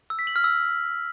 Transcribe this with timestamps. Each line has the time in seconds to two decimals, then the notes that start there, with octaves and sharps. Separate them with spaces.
0.10 E6
0.19 B6
0.27 F#7
0.36 F6
0.44 E6